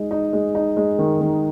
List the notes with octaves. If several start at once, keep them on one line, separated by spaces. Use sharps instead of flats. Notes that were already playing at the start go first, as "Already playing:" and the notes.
Already playing: G#3 D#4
D#4
G#3
D#4
G#3
D#3
D#3